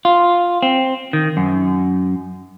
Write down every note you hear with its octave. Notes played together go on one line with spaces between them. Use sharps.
F4
C4
D#3
F#2